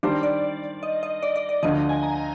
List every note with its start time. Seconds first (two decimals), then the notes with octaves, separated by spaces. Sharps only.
0.03 D#3 G3 D4 G4 C5 D5
0.23 D5
0.83 D#5
1.03 D#5
1.23 D5
1.36 D5
1.49 D5
1.63 D2 D3 F3 D#5
1.89 G#5
2.03 A#5